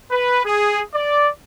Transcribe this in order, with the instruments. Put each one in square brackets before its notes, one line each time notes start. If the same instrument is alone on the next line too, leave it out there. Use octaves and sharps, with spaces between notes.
[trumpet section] B4
G#4
D5